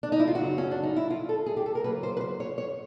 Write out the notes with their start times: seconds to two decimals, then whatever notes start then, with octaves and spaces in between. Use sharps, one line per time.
0.03 D4
0.12 D#4
0.20 E4
0.27 F4
0.35 F#2 C#3 F#3 F#4
0.58 C#4
0.71 D4
0.83 D#4
0.96 E4
1.10 F4
1.29 A4
1.46 G#4
1.57 G4
1.66 A4
1.75 A#4
1.84 C#3 F#3 A#3 C#4 B4
2.03 C5
2.17 B4
2.21 C5
2.40 C#5
2.58 C#5